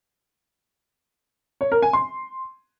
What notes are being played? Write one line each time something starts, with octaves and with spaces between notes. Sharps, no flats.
C#5
A#4
G#5
C6